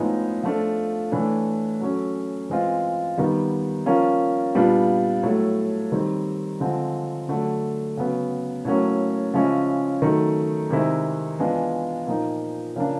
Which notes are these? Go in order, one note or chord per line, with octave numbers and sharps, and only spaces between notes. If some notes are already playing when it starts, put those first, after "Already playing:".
Already playing: A2 F3 G#3 B3 D#4
F3 A3 D4 F4
A2 E3 A3 D4
F#3 A3 C#4
E3 G#3 C4 F4
D#3 G3 B3
F3 A#3 C#4 F4
A#2 G3 B3 D4 F4
A2 F#3 A3
D#3 G3 C4
D3 F3 G#3 C4
D3 F#3 A3 D4
C#3 F#3 B3
A2 F#3 A#3 C#4
C#3 F3 G#3 C#4 E4
D#3 F#3 A3
C3 D#3 G#3 C4 E4
E3 G#3 B3 D4 F4
A#2 F3 A#3 D#4
C#3 F3 A#3 D4